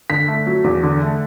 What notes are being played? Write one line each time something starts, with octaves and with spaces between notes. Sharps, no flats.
D3 B6
A3
F#3
E2
D3
A3